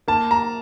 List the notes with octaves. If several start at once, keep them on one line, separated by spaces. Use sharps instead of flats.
A#3 A5
A#5